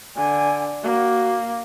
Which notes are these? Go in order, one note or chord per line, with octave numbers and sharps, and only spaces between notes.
D3 G#5
A#3 F#4